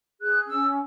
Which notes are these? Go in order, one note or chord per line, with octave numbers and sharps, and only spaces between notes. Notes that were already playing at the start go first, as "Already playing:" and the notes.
G#4 F#6
C#4 E6